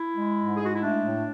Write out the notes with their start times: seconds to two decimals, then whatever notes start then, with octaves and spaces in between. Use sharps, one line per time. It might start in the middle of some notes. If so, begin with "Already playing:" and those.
Already playing: E4
0.16 G#3
0.37 G#2
0.56 G#4
0.60 G#3 F#4
0.74 E4
0.82 A3 D4
1.04 A2